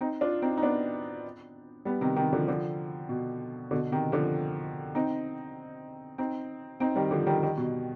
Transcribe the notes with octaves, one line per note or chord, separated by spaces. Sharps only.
C4 D#4
D4 F4
C4 D#4
D#4
B3 D4
G3 B3
C3 D#3
C3 D#3
D3 F3
D3 F3
B2
B2 D3
C3 D#3
D3 F3
C4 D#4
C4 D#4
C4 D#4
D#3 G3
D3 F3
D#3 G3
D#3 G3
B2